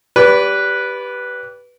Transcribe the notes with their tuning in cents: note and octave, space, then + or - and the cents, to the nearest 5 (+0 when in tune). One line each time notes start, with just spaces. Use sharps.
G4 +0 B4 -5 D5 -30